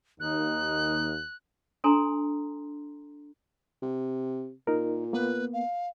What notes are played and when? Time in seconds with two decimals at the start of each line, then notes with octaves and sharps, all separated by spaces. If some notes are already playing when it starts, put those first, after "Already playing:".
0.20 D#2 D#4 F#6
1.84 D4 A4 G#5 A#5 C6
3.82 C3
4.67 A#2 D#4 A#4
5.13 A#3 B3 B4
5.53 F5